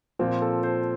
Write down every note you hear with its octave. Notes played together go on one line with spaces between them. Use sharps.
A#2 F3 C4
A4
C5